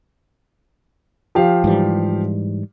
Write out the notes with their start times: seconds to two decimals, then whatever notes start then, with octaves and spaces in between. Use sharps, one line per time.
1.35 F3 G4 F5
1.64 G#2 E3 G3